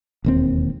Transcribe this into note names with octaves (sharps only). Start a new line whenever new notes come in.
E1 D#2 C4